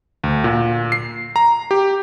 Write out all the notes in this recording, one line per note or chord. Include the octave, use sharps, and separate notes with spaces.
D2
A#2
C7
A#5
G4